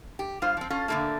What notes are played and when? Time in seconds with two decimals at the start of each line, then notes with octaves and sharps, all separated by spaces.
0.19 G4
0.42 G2 F4 C5 F5
0.57 F3 C4
0.70 C#4 F4 A4
0.88 A#2 D3 E3 A3 A#3